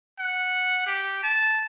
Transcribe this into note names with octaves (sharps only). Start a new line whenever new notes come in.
F#5
G4
A5